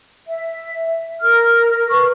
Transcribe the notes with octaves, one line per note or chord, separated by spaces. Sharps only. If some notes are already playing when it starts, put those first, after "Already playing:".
E5
A#4 F6
B4 C#6